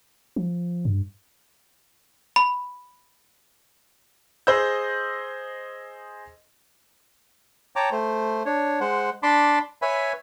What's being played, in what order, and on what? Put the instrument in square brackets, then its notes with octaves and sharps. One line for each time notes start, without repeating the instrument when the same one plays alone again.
[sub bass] F3
G2
[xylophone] B5
[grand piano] G#4 C5 D#5 E6 G6
[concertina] C#5 G5 A5 A#5 D6
A3 C5
D4 C#5
G#3 C5 F#5
D4 A5 B5 C6 D6
B4 C#5 E5 G#5 B5